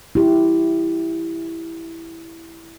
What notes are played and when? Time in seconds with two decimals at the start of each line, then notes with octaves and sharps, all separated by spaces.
0.15 E4 G4